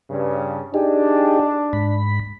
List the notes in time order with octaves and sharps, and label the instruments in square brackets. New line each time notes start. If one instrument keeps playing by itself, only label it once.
[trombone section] G2 C#3
[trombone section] D4 [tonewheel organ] D#4 G4 G#4
[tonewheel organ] G#2 B5